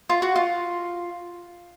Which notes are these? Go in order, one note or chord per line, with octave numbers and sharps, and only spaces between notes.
F4
F#4
F4